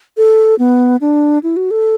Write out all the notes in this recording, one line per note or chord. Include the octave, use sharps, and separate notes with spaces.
A4
B3
D4
E4
F#4
A4